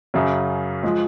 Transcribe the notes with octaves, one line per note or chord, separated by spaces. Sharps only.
F#2 C#3 F#3
F3 G#3